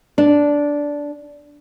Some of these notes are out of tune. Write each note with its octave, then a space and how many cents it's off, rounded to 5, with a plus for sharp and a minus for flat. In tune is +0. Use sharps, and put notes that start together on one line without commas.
D4 -10